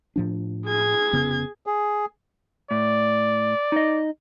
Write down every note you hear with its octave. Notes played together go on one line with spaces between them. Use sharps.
A2 F3 D4
G#4 G#6
F1 C#3 B3
G#4
A2 D5
D#4 D#5